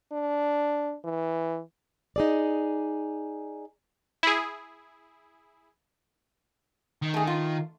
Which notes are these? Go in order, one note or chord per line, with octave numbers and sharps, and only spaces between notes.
D4
E3
D#4 G#4 D5
E4 G#4
D#3
A3 G#4
F4